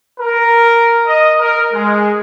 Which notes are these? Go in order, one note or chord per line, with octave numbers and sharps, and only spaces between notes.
A#4
D#5
A#4
G#3